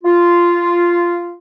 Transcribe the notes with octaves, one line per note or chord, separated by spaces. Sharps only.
F4